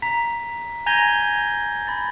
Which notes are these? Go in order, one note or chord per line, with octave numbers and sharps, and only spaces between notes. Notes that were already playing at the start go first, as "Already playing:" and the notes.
A#5 B6
G#5 A#5 G6 G#6 A#6 G7
B5 A6